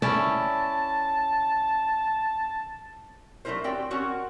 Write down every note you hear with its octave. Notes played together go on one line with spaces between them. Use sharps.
C#4 E4 D5 A5
F#3 A3 D4 E4 A#4 C5
C4 F#4 G4 D5 G5
C4 C#4 F#4 A#4 F#5